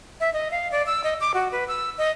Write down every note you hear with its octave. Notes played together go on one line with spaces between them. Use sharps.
E5
D#5
F5
D5
E6
D#5
D6
F#4
B4
E6
D#5